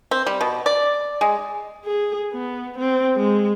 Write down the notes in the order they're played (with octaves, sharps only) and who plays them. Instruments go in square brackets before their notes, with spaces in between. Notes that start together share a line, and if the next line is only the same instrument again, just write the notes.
[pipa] C4
G3
B2
D5
G#3
[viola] G#4
B3
C4
G#3